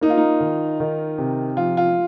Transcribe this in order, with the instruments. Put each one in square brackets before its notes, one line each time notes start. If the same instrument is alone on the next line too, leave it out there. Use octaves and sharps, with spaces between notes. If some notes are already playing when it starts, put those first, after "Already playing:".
[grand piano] A#3 [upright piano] D#4
[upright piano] F4
D#4
[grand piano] D#3
D#3
C3
[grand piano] F3 [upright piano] F4
[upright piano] F4